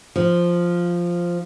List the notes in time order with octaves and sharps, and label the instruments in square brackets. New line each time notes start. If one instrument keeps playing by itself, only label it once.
[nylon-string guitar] F3